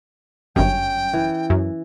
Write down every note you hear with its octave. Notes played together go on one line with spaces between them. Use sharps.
G1 F#2 C#4 G5
E3
F#2